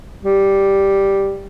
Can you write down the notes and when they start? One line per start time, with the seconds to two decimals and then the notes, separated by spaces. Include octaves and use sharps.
0.24 G3